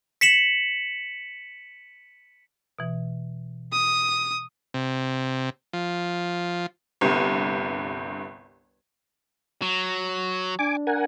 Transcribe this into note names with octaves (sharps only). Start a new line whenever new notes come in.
B6 C#7 E7 F#7
B2 E3
D#6
C3
F3
G1 C2 G2
F#3
D4 G#5 D6
A#4 F#5 G#5